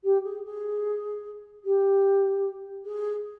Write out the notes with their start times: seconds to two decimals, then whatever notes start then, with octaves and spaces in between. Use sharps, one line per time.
0.03 G4
0.24 G#4
0.44 G#4
1.64 G4
2.85 G#4